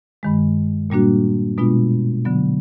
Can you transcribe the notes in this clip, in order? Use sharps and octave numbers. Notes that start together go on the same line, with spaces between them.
G2 D#3 G#3
A#2 G3 A#3 D4 F#4
B2 G#3 B3 D4 F4
D3 F#3 B3